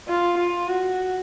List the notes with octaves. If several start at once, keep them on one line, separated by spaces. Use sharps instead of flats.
F4
F4
F#4